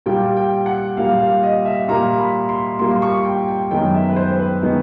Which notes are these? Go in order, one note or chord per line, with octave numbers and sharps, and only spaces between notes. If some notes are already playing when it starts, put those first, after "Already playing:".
A#2 G3 A#3 G5
G5
F#5
A#2 G3 A#3 F5
F5
D#5
E5
A#2 G3 A#3 A#5
B5
C6
A#2 G3 A#3 C6
C6
C#6
G5
G5
F#2 D#3 G#3 B3 G5
E5
B4
C5
C5
B4
D#3 G#3 B3